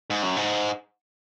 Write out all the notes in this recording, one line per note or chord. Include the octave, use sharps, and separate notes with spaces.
G#2
F#2
G#2